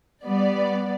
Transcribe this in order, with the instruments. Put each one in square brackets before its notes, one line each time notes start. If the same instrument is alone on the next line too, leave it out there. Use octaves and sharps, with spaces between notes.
[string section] G3 B3 D5